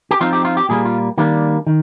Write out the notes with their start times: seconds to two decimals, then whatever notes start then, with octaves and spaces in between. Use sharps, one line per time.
0.11 G4
0.21 F3 C4 D#4 F4
0.33 G4
0.45 F4
0.57 G4
0.69 A#2 G3 A#3 G#4
0.85 F4
1.18 D#3 G3 A#3 D4
1.67 D#3